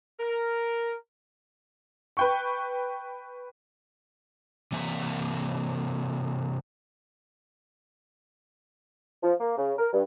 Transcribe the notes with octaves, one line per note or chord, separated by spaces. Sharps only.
A#4
B4 G5 C#6
C3 E3 A#3 E5
F3
A#3
C#3
A#4
G2